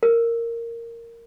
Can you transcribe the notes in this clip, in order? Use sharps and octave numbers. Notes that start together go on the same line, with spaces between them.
A#4